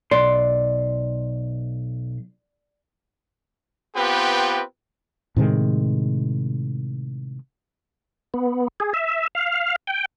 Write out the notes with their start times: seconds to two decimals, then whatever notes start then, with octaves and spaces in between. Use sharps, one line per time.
0.11 B1 D5 C6
3.94 B3 C4 F4 G4 B4 G5
5.36 A2 C3 D#3 G#3
8.34 B3
8.80 G#4
8.94 E5
9.35 F5
9.87 G5